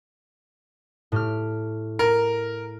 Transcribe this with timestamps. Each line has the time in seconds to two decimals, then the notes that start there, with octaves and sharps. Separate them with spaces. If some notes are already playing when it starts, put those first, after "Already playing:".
1.12 A2 G4 F6
1.99 A#4